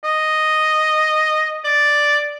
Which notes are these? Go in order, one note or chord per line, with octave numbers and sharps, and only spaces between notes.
D#5
D5